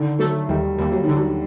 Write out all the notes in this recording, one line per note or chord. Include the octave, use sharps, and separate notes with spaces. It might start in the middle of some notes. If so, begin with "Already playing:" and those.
Already playing: D3 D#3
F#3 A3
D#2 G3
D#2 G3
F#3
D3 D#3
F#3